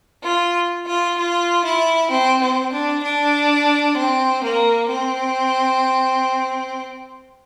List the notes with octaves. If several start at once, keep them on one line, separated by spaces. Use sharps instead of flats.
F4
F4
F4
E4
C4
C4
D4
D4
C4
A#3
C4